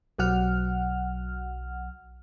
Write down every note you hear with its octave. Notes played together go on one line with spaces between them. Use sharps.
B1 F#3 F#5 F6